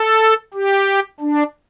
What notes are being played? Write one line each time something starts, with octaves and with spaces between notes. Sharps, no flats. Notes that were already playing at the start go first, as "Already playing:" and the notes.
Already playing: A4
G4
D4